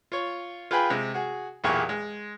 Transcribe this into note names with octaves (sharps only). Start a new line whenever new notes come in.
F4 C#5
F4 G#4 B4 G5 G#5 B5
C3 G#3
F#4 G#4
B1 E2 A#2 G4 G#4 C#6
G#3